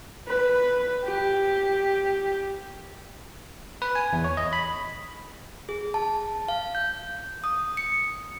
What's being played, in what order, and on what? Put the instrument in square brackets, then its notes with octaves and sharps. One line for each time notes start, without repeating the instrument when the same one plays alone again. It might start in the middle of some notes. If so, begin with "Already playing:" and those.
[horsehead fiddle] B4
G4
[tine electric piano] B4
G#5
E2
C#5
D#5
B5
[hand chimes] G#4
A5
F5
G6
D#6
C#7